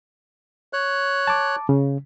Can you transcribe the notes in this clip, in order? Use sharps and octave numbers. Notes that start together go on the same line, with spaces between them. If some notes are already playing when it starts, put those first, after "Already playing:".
C#5 F#6
A5 D6
C#3